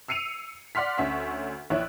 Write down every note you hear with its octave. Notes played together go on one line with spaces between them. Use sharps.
E6 C7 C#7 D#7 F7
D5 F#5 C6 F6 B6
D2 C#4 E5 C#6 B6
A#1 E4 C#5 F#6